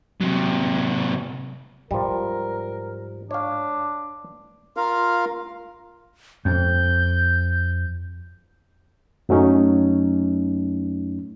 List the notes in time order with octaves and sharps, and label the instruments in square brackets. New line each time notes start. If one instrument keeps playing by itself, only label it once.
[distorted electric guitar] C3 F#3
[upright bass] G#2 [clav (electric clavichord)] F3 G3 [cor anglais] A#4
[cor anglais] D4 [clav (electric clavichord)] C#5 F5
[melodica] F4 A#4 F5
[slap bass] F2 [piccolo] G6
[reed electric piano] F#2 F#3 A3 C#4 D#4